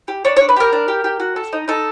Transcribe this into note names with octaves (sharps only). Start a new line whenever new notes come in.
G4
D4 C#5
C#5
D4
B4
G4 A#4
D4
G4
G4
F#4
A4
D#4
D#4 A4